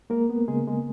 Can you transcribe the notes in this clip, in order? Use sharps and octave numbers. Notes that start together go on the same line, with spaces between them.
G#3 A#3 A#4
B3
C#3 G#3 G#4
G#3